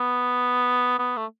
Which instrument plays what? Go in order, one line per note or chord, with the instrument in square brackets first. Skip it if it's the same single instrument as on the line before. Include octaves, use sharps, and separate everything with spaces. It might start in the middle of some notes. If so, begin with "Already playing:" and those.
Already playing: [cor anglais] B3
B3
A3